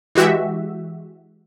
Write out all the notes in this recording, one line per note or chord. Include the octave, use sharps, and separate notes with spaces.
E3 G#3 F#4 G4 E5